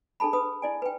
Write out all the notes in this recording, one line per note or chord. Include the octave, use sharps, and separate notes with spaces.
D4 G#4 A4 A5 B5
B4 B5 D#6
E4 D5 G#5
B4 G5